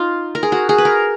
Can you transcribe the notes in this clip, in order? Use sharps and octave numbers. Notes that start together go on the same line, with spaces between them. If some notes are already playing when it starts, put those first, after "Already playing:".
Already playing: D#4 F4
A#4
G#4
F#4
G#4
B4
A#4